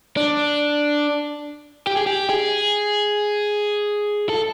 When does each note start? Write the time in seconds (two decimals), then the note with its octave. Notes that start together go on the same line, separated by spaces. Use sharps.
0.17 D4
1.87 G4
1.96 G#4
2.06 G4
2.30 G#4
4.29 A4